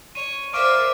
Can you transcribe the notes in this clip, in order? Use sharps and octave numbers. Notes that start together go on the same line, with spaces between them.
C#5 D#7
A#4 C5 D5 E5 F5 D6 D7